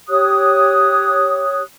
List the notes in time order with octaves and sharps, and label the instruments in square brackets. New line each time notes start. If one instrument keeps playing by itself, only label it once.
[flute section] G4 C#5 D#6 F#6